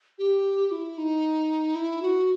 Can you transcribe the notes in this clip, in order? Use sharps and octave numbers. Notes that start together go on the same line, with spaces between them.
G4
E4
D#4
E4
F#4